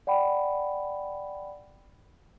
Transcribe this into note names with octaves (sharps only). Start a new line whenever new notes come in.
D5 F#5 G5 B5